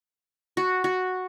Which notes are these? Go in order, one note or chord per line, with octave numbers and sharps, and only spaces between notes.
F#4
F#4